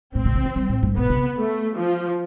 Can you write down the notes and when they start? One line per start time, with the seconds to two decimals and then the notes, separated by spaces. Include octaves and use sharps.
0.15 A2 C4
0.25 B2
0.35 C3
0.46 D3
0.56 G3
0.69 A2
0.83 G2
0.96 B2 B3
1.10 C3
1.38 A3
1.78 F3